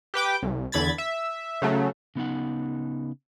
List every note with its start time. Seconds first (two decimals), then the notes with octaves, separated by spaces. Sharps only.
0.14 G4 B4 G5 D6
0.43 C2
0.72 E2 D3 B5 G#6 A6
0.98 E5
1.62 C#3 F#3 A3
2.16 C#3 B3 D#4 F#5